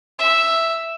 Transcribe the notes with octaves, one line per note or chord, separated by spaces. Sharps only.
E5